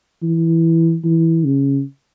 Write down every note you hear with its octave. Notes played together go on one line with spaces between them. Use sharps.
E3
E3
C#3